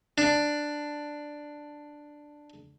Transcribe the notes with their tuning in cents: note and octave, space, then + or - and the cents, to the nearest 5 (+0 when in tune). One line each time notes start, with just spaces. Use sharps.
D4 +5